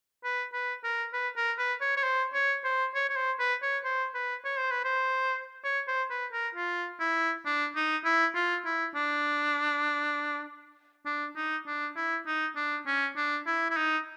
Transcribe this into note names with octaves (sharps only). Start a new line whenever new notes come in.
B4
B4
A#4
B4
A#4
B4
C#5
C#5
C5
C#5
C5
C#5
C#5
C5
B4
C#5
C5
B4
C#5
C5
B4
C5
C#5
C5
B4
A#4
F4
E4
D4
D#4
E4
F4
E4
D4
D4
D#4
D4
E4
D#4
D4
C#4
D4
E4
E4
D#4